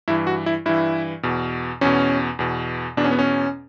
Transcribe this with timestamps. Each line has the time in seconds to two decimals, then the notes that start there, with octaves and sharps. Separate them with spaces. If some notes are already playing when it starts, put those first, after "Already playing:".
0.08 G2 E3 E4
0.27 F#4
0.46 E4
0.65 G2 E3 E4
1.23 E2 B2
1.81 E2 B2 C#4
2.39 E2 B2
2.97 E2 B2 D4
3.04 C#4
3.11 B3
3.19 C#4